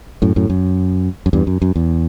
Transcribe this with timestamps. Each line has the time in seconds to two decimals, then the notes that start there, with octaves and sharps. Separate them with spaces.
0.22 F#2 A2
0.36 F#2 A2
0.50 F#2
1.26 F#2
1.33 E2 G2
1.47 F#2
1.62 F#2
1.76 E2